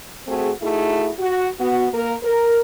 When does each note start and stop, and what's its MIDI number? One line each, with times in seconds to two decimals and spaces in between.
0.27 0.50 57
0.27 0.50 60
0.27 0.50 66
0.27 0.50 68
0.61 1.10 57
0.61 1.10 63
0.61 1.10 64
0.61 1.10 66
0.61 1.10 68
1.19 1.48 66
1.59 1.86 59
1.59 1.86 66
1.93 2.14 58
1.93 2.14 70
2.23 2.60 70